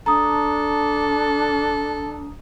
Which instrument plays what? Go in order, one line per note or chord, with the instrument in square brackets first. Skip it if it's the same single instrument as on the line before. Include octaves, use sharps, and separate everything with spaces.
[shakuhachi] D4 [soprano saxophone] A4 [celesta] A#5 D#6